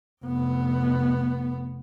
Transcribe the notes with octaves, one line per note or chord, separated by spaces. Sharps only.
F1 B3